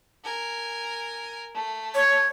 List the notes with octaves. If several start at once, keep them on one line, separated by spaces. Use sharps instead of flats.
A#4 G#5
A3
C#5